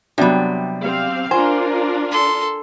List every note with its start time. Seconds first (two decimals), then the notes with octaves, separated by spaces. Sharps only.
0.18 C3 F#3 G3 B3 D4
0.83 C4 G4 F5
1.31 D4 F4 A#4 C5 G#5
2.11 A4 C6